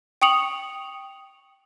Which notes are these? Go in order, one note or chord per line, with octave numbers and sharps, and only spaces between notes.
G5 C#6 D#6 C#7 F7 F#7